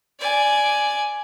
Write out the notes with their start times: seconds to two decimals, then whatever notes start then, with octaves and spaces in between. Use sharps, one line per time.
0.20 D5 G#5